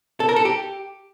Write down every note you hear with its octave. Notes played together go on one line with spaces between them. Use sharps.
A4
A#4
A4
G4